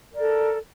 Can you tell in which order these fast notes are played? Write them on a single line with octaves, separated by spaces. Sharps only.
A#4 D5 A4